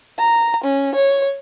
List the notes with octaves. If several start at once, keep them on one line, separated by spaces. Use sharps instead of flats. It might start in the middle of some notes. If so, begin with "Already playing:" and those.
A#5
C#4
C#5